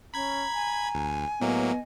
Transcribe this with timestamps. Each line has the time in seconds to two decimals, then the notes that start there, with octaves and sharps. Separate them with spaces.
0.14 C#4 A#5 B5 G#6
0.54 G#5
0.95 D2
1.41 A2 F#3 A#3 B3 D#5